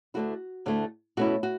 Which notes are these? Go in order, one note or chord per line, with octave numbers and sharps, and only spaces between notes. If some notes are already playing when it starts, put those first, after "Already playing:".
D2 D3 A3 E4 F#4
D2 D3 A3 E4
B2 A3 C#4 E4 F#4
F#4